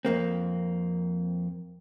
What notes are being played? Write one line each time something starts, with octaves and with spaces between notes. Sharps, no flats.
F2 A#3 C4